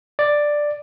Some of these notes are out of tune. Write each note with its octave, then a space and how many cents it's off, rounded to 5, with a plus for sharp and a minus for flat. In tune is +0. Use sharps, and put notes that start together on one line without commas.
D5 +5